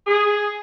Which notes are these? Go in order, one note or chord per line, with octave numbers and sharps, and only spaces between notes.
G#4